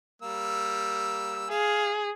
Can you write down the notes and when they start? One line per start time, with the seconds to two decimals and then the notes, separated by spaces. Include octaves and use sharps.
0.22 G3 A#3 E6
1.51 G#4 F5